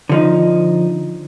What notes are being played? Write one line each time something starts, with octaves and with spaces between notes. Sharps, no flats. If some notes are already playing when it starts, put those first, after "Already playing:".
D3 F3 D#4